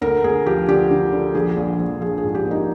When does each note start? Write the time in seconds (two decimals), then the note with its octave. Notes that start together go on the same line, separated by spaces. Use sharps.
0.01 D2 A#4
0.24 D2 G#4
0.46 F3 G4
0.68 D3 G4
0.91 D3
1.13 D3
1.35 A#1 G#4
1.57 A#1
1.79 A#1
2.01 F3 G#4
2.18 G#4
2.23 G#2
2.35 G4
2.45 A#3
2.51 D#4